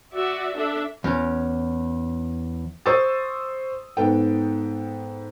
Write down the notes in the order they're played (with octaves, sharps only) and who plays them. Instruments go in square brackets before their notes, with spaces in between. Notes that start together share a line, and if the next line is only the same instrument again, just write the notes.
[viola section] F#4 D5 E5
D4 A4 E5
[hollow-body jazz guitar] E2 C#4
[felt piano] C5 C6 C#6 D#6 E6 A6
G#2 B3 A4 G5